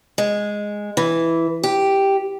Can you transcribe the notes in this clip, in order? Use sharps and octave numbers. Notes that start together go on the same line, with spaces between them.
G#3
E3
G4